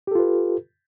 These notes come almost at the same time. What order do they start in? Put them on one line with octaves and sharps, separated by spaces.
G4 A4 F4 B4